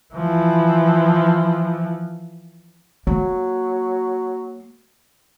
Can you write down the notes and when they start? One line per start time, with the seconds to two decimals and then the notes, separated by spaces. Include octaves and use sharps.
0.14 E3 F3
3.07 F#3 A#3